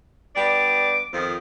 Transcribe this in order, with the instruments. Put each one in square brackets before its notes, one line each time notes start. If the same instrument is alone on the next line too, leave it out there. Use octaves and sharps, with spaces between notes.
[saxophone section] G3 B3 D4 [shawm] D6
[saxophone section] F2 D#3 F3